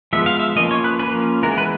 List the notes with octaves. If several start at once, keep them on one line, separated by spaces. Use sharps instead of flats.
F3 G#3 B3 E5
F5
E5
F3 A#3 C#4 D#5
C#5
B4
F3 A#3 C#4 B4
E3 G#3 B3 A#4
B4